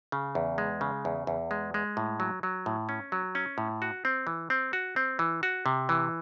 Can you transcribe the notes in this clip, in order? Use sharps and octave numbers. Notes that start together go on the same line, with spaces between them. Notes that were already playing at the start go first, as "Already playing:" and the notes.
C#3
E2
G#3
C#3
E2
E2
G#3
G#3
A2
F#3
F#3
A2
C#4
F#3
C#4
A2
F#4
C4
E3
C4
F#4
C4
E3
F#4
C3
E3